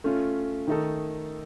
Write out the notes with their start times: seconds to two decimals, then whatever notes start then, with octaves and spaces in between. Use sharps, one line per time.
0.04 A3 C#4 F4
0.67 D#3 A3 D#4 A4